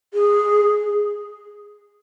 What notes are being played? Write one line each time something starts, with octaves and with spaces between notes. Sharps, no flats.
G#4